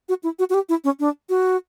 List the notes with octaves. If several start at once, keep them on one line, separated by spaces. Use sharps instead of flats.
F#4
E4
F#4
F#4
G4
E4
C#4
D4
F#4